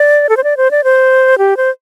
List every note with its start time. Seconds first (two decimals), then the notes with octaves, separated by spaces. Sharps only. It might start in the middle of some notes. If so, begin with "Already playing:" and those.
Already playing: D5
0.29 A4
0.37 C5
0.44 D5
0.57 C5
0.71 D5
0.84 C5
1.38 G4
1.57 C5